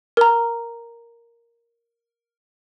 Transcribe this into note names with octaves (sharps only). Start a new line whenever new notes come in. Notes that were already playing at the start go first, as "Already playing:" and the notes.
A#4 A#5